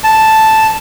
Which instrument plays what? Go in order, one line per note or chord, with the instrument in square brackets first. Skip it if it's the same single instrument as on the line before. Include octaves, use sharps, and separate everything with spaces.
[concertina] A5